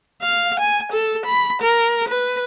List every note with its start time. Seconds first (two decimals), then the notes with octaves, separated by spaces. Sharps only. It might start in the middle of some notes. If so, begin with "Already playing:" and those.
0.22 F5
0.60 G#5
0.93 A4
1.26 B5
1.62 A#4
2.08 B4